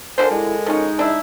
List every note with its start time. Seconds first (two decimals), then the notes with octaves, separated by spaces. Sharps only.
0.18 D3 F3 D4 A4 A#4 C5 G#5
0.31 G#3 E4
0.66 F3 C#4 D#4
0.99 D4 E4